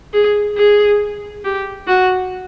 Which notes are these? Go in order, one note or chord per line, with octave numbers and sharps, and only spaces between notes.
G#4
G#4
G4
F#4